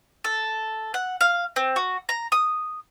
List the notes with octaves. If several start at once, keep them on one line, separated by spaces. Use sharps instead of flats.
A4
F#5
F5
C4
F#4
A#5
D#6